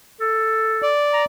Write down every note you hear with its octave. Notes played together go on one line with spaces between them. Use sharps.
A4
D5
A#5